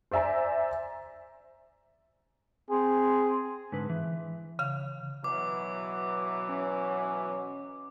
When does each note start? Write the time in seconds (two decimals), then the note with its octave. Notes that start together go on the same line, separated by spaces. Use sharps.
0.11 C5 D5 E5 G#5 A#5
2.70 C4 G#4
3.72 G#2 D3 B4
3.89 E3
4.59 C#3 F5
5.24 B2 E3 F#3 D6
6.50 C#4